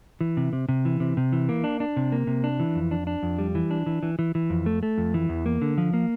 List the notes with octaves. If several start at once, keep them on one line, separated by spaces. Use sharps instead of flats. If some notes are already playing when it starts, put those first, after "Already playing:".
E3
C3
C3
C3
E3
C3
C3
E3
A#3
D4
D4
C3
A#3
C3
D4
E3
F2
D4
D4
F2
G3
E3
D4
E3
E3
E3
E3
F2
A3
A3
F2
E3
E2
A#3
D3
F3
A#3